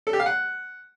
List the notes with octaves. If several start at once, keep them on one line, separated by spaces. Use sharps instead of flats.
A4
G4
F5
F#5